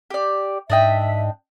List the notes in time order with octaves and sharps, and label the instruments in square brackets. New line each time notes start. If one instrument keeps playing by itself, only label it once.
[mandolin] G4 D5
[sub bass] G#2 [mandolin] D4 D#5 G5 [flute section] E5